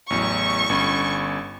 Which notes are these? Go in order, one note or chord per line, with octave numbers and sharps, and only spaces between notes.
A1 E2 F#3 C#6
G1 C#4 B5